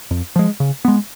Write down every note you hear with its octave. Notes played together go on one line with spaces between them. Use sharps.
F2
F3 G#3
C#3
G#3 B3